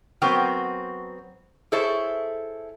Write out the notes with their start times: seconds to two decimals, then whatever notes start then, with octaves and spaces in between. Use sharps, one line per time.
0.22 F#3 B3 C4 F#4 A#4 G5
1.72 E4 G#4 A4 C5 C#5 E5